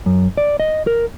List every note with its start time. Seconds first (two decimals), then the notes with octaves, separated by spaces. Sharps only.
0.06 F#2
0.37 D5
0.60 D#5
0.87 A#4